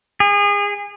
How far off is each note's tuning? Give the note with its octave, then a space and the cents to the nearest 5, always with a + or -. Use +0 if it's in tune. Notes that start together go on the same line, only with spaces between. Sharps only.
G#4 -30